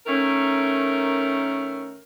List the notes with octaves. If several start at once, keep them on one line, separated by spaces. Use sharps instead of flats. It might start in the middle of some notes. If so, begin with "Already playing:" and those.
D#3 A3 C#4 A#4